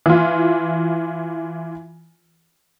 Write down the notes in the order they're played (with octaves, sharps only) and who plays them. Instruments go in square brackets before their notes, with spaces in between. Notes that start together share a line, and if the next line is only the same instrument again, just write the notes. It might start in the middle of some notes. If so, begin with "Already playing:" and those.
[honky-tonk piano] E3 F4